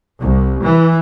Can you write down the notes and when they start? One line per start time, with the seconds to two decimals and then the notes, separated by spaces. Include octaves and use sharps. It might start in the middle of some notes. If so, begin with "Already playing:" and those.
0.22 C2
0.64 E3